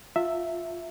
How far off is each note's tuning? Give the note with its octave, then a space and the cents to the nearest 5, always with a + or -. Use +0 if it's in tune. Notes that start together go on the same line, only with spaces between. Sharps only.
F4 +10 E5 +0 A#5 -45